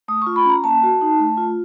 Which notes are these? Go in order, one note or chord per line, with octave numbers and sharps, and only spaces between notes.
A3 D#6
C#6
F4
B5
C#4 A#5
A#3 A5
F#4
D#4
A3
F4